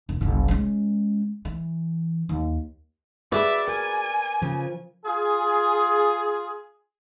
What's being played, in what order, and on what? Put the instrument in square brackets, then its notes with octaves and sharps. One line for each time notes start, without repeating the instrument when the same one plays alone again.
[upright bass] E1
F#1 C2
G#3 C#4
E3
D#2
[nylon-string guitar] F#4 G#4 [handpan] B4 [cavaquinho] D5 D6 [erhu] E5
[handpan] A#4 [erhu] G#5
[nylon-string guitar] C#3 [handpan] F3
[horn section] F4 G#4